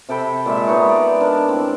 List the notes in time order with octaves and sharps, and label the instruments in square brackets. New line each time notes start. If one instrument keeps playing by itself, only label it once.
[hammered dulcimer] C3 A4 G5 B5
A#2 G#3 E5
B3 D#4 B4 C#5
D5
D4 A#4
A2 C4